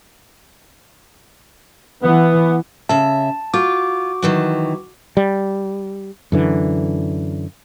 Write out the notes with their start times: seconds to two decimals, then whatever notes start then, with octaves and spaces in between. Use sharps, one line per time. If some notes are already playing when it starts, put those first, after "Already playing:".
2.02 E3 B3
2.89 C#3 E5 A5
3.54 F4 F#4 D6
4.22 D#3 E3 F#3
5.17 G3
6.32 F#2 D3 E3